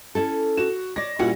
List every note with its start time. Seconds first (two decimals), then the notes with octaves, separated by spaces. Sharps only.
0.15 C#4 E4 A4
0.57 F#4 E7
0.96 C#5 D5 A#6
1.19 A#2 G3 C#4 E4 F#4 F#5